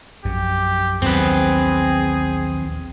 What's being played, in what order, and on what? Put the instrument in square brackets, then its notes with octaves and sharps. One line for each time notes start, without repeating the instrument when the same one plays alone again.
[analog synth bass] A#1 [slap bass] F#2 [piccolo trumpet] G4
[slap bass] D#2 F#3 B3 [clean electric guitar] C4 B4 [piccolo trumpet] G#4